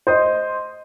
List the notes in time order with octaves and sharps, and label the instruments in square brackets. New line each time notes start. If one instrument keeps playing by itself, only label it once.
[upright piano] C5 D#5 C6